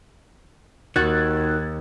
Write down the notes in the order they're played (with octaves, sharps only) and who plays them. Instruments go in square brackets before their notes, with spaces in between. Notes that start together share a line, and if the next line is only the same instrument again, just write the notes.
[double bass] D#2 [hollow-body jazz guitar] D#3 F#4 [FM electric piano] F#6 G#6 A6